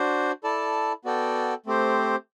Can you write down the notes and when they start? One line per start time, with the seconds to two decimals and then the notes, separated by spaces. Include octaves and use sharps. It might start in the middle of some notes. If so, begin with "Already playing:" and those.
Already playing: D4 F#4 C5
0.44 E4 A4 D5 A5
1.05 B3 F#4 A4 D5 G5
1.66 A3 C4 G4 C5